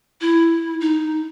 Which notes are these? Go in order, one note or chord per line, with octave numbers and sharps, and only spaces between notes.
E4
D#4